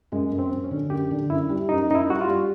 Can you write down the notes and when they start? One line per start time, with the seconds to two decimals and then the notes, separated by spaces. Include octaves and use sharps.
0.12 F#2 G#3
0.32 F#2
0.39 C4
0.51 F#2
0.64 C#4
0.71 D3
0.90 F#2 G4
1.11 D3
1.30 F#2 E4
1.49 G3
1.69 F#2 D#4
1.89 F#2 D#4
1.95 E4
2.09 G3 F#4
2.21 F4
2.28 G3